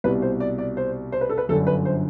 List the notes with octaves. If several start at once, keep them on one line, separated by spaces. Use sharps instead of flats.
C2 B2 G3 B4
C5
D5
D5
C5
C5
B4
A4
B4
G1 F#2 D3 A4
B4
C5